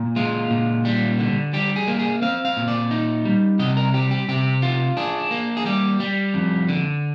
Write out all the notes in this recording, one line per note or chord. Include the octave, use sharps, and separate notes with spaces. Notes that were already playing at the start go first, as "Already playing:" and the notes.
Already playing: A#2
G#3 F4
A#2
G3
D3
G3 G4
G#4
A#3
G#4
C4 F5
F5
A#2
D5
D#4
G3
C3 D#5
A#4
G3 G4
G4
C3 G4
F4
D4 G#4
A#3
G#4
G3 G4
G3
F2
D3